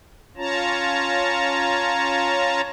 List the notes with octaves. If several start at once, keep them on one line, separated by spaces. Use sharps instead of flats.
C#4 F4 C#5 A5 A#5